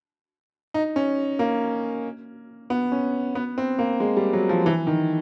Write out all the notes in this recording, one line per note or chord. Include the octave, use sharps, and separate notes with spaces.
D#4
C#4
A#3
B3
C#4
B3
C4
A#3
G#3
G3
F#3
F3
E3
D#3